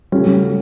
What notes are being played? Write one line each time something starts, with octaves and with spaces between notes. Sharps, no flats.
C#3 F#3 G3 A3 C#4